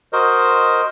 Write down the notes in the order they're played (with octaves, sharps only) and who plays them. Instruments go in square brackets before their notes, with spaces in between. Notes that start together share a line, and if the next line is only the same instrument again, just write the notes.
[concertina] F#4 A#4 C5 D#5